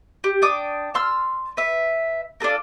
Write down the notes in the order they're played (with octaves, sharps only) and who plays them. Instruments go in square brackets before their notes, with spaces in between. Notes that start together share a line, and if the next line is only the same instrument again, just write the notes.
[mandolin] G4
D4 G5 D6 D#6
A5 C6 E6 F6
B4 E5
D4 F4 A4 A#4